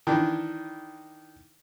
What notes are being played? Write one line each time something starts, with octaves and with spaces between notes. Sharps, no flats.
D#3 E3 D4